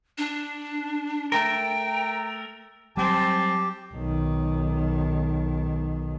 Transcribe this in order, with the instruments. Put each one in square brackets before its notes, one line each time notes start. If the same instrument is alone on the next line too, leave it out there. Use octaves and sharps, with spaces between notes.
[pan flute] D4
[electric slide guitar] A3 A#4 [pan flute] G5
[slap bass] F#3 G3 [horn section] C4 G#5 A5 [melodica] G4
[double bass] B1 D#3